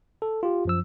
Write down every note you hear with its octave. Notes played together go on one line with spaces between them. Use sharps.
A4
F4 G4
F#2 F3 E6